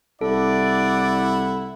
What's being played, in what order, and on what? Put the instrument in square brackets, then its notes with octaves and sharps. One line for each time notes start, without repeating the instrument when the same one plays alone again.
[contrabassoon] C2 [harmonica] E4 F#5 [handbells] A4 [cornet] D5